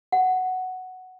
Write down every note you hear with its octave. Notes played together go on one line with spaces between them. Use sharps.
F#5